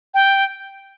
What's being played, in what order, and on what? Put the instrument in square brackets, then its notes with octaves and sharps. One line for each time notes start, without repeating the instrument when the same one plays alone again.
[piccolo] G5